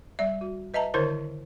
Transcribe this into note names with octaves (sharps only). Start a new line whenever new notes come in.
G3 D5 E5
F#4
B4 D#5 E5 A5 A#5
D3 D#3 E4 A#4 C5 C#5